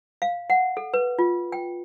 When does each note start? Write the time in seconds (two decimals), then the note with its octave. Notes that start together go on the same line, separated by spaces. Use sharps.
0.22 F5
0.50 F#5
0.77 A4
0.94 B4
1.19 F4
1.52 G5